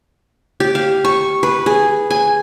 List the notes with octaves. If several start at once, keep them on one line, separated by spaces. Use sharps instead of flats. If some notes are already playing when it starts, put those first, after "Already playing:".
G4
F5
C#6
B4
G#4
G#5